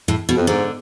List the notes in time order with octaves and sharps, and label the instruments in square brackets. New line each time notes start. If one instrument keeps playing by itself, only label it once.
[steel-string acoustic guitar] A2
B2
[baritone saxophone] F2
[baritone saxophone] G#2 [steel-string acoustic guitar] D3